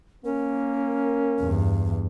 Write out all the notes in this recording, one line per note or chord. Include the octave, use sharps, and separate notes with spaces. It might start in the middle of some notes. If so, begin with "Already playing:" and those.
A#3 C#4 A#4
E2 G2